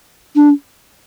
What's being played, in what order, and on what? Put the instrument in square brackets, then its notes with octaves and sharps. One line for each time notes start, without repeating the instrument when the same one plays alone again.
[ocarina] D4